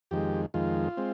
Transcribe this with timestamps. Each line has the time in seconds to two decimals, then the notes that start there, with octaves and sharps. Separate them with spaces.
0.11 F2 D#3 G#3 G4
0.54 F2 D#3 G#3 F4
0.97 G#3 C4